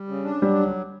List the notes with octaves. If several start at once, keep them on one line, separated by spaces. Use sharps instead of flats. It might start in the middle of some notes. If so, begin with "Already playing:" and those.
Already playing: G3
C#3
D4
F#3 G3
D2